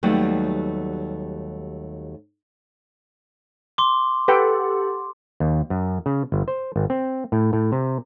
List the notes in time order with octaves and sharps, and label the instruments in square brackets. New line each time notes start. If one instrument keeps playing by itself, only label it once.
[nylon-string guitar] D#2 F#3 G3 A3 B3
[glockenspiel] C6 D6
[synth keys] G4 A4 F#5 [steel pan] B4 G5
[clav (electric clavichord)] D#2
F#2
C#3
G1
C5
G#1
C4
A2
A2
C3